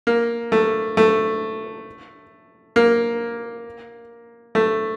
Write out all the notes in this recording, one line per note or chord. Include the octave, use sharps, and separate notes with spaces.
A#3
A3
A3
A#3
A3